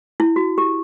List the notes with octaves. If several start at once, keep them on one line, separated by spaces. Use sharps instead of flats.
E4
F#4
G4